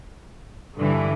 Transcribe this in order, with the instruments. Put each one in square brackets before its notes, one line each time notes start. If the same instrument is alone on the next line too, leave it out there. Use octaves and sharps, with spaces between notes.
[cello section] G2 E3 [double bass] D3